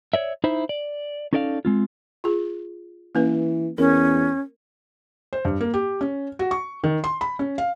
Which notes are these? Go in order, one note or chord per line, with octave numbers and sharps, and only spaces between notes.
C#5 D5 E5
D#4 E4 C5 E5
D5
C#4 D#4 A4 D5 D#5 F5
G#3 C4 F4
F4 G#4
E3 A#3 C#4 B4
E2 C#4 A#4
C5
G2
A#3
G4
C#4
F#4
C#6
D#3
C6
B5
C#4
F5